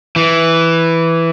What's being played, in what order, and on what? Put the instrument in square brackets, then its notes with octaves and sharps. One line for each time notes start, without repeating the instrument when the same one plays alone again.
[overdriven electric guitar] E3